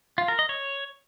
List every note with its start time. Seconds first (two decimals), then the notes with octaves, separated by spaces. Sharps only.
0.18 F4
0.28 A#4
0.39 D#5
0.49 C#5